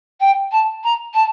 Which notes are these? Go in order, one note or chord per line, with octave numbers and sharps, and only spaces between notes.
G5
A5
A#5
A5